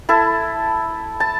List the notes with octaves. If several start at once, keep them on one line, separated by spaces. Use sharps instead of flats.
E4 A4 A5
A5